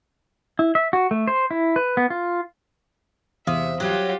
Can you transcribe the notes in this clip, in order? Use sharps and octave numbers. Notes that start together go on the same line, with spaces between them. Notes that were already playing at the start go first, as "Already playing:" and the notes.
E4
E5
F#4
A3
C5
E4
B4
B3
F4
E2 C3 E5 F5 D#6
F#3 F4 G4